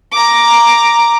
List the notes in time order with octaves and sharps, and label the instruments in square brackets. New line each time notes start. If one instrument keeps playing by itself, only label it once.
[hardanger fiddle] A#5 D6